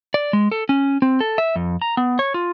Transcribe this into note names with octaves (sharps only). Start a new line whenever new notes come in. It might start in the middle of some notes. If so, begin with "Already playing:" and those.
D5
G#3
A4
C#4
C4
A4
E5
F2
A#5
B3
C#5
F4